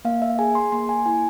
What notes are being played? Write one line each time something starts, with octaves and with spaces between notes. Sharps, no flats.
A#3 F5
E5
G#4 G#5
C6
A#3 C6
G#5
E4 G#5